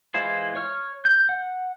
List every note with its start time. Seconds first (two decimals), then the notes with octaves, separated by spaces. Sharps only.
0.14 E3 G#3 E4 F4 C5
0.55 C#5 C#6 F6
1.05 G6
1.29 F#5